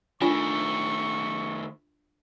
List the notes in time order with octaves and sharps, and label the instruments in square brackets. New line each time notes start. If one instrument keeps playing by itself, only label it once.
[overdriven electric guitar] D#3 A3 [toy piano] D4 F4 G#5 [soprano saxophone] C#6